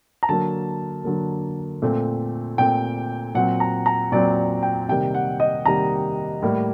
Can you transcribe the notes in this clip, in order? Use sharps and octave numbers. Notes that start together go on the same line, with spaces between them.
A#5
D3 F#3 A#3 A5
D3 F#3 A#3
A#2 A3 C4
A#2 A3 C4 G5
A#2 F#3 C4 F#5
A#5
A#5
A#2 F#3 C4 D5
G5
C3 D#3 G3 A#3 G5
F#5
D#5
C3 D#3 G3 A#3 A#5
A2 G3 A#3